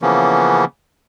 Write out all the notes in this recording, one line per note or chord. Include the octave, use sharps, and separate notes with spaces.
C#3 E3 F3 A#3 B3 C#4